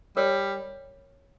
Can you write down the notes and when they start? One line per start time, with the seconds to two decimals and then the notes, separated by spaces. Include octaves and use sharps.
0.17 G3 A#4 C#5